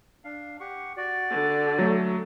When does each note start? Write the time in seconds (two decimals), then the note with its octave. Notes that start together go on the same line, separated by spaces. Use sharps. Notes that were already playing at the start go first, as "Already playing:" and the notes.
0.24 D4 F5
0.60 G4 F#5 C#6
0.97 F#4 D5
1.30 D3
1.79 F#3 A3